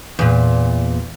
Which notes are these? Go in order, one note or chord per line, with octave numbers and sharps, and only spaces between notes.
E2 A#2